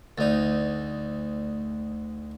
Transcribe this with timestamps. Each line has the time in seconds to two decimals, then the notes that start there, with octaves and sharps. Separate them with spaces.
0.18 D2 D#4 D5 A6